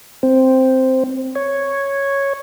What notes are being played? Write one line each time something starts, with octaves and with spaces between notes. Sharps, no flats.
C4
C#5